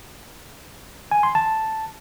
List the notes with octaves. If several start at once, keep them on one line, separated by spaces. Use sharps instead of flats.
G#5
C6
A5